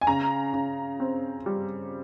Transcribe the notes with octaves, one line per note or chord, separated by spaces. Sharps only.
G#5
C#3 A#5
C#3
C4
G3